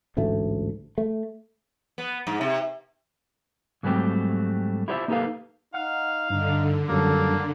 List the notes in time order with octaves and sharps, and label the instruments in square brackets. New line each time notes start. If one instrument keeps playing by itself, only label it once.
[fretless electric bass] A1 D2 G#2 A3
A3
[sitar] B3
G#2
C3
[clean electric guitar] G#2 F#3 G3 A3 C4 G4
E4 F4 G4 C5 D5 E5
A#3 D#4 G4 A4 B4 F5
[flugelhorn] D#4 [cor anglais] F5 [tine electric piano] F#5 F6
[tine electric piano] G2 [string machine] D3 [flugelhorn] D#4
[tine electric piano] F#2 F#3 G3 [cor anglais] A#3 [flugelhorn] A4